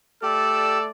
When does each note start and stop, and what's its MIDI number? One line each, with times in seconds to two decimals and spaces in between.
0.23 0.89 57
0.23 0.79 67
0.23 0.89 69
0.23 0.89 74
0.23 0.84 88